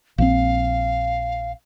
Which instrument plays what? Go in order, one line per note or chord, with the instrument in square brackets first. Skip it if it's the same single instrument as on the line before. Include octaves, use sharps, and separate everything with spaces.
[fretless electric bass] A#1 C#3 C4 [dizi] F5